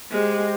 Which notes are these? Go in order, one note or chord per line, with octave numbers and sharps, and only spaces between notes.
G#3 G4 C5 D#5